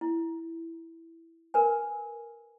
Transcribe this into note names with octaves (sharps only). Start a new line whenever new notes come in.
E4
A#4 B4 G#5